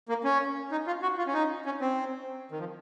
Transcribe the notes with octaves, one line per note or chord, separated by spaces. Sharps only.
A#3
C#4
D#4
F4
F#4
F4
C#4
D#4
C#4
C4
D#3
F3